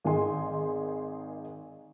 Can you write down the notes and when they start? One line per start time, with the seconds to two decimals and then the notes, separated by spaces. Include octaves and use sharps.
0.04 G#1 D#3 D#4 G#4 G#5 C6